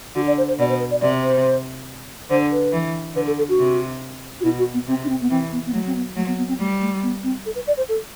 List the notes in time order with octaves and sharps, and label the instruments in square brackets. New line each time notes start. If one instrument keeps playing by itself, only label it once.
[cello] D3 [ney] F#4
[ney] D5
C5
C5
[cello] B2 [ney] D5
[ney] C5
B4
D5
[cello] C3 [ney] D5
[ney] C5
[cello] D3 [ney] C5
[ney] B4
[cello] E3
[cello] D3 [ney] B4
[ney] A4
A4
F#4
[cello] C3
[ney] F#4
[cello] B2 [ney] E4
[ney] F#4
B3
[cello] C3 [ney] C4
[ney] D4
C4
B3
[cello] E3 [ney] C4
[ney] B3
B3
[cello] F#3 [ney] A3
[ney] C4
B3
[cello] F#3 [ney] A3
[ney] B3
B3
C4
[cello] G3 [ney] A3
[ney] A3
B3
C4
A4
B4
D5
C5
A4